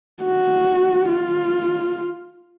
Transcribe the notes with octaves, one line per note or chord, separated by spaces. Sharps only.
F#4
F4